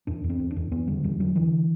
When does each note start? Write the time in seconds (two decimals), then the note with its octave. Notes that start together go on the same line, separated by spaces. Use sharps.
0.07 E2 D4
0.24 E2
0.30 C4
0.39 E2
0.51 D4
0.56 E2
0.72 E2 B3
0.87 D3 G3
1.04 E2 G3
1.20 D3 F#3
1.35 D3 E3